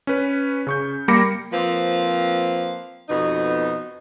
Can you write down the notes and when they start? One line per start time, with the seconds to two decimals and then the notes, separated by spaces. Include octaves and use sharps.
0.07 C#4 B4
0.67 C#3 C#6 G6
1.08 G3 A#3 B5 D6 A#6 C#7
1.52 F3 A#3 C4 B4 F5
3.09 F2 B2 B3 D#4